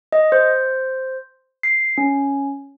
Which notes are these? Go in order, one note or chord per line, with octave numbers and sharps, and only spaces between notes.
D#5
C5
C7
C#4